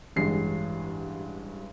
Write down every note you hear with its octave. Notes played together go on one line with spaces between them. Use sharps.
A1 G2 G#3 C7